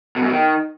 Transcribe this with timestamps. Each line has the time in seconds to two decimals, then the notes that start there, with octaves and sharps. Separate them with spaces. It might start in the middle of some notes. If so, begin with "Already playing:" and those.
0.16 B2
0.21 F#2
0.27 B2
0.32 D#3